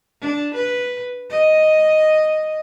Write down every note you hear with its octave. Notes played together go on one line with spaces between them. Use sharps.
D4
B4
D#5